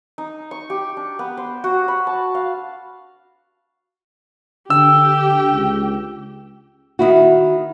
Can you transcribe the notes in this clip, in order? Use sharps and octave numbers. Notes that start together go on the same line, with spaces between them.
D#4
C#6
G4
D4
B3
C5
F#4
B5
A5
F5
D3 G4 G5 E6
C#2
D#3 E4 F#4